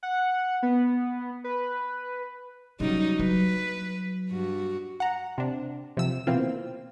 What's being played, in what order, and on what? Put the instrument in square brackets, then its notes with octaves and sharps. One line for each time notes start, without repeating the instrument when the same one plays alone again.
[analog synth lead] F#5
B3
B4
[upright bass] C#3 [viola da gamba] F#3 G3 D#4
[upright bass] F#3 [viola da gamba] B4
[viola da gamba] G2 F#4
[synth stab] F#5 A#5
C3 D4
C3 F3 E6
B2 E3 A#3 C4 F4